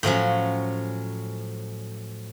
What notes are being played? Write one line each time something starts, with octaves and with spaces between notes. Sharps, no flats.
A2 F3 F#3 C#4